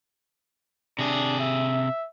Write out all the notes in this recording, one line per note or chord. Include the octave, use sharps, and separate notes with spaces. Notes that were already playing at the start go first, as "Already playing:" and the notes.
C3 D4 G#4
E5